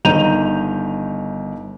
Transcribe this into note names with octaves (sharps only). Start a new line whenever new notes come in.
G1 D#3 A#5 G6 D#7 F7